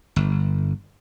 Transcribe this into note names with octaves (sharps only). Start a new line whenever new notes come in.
G1